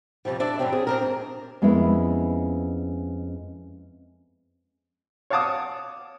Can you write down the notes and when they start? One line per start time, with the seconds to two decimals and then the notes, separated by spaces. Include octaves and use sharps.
0.25 F2 A2 C3 F3 G3
0.40 D4 A4 D5 E5
0.59 G2 D3 F#3 G3 C4
0.72 G#4
0.87 C4 D4 A#4
1.02 G#2
1.62 F2 G#3 B3 C#4 E4 A#4
5.30 C#5 F5 F#5 A5 D6 D#6